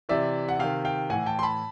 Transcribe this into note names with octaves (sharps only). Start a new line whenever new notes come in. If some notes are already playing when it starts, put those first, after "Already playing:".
C3 E3 D5 E5
F#5
C3 D#3 F5 G5
F5 G5
A2 E3 F#5 G#5
G5 A5
C6
A5 B5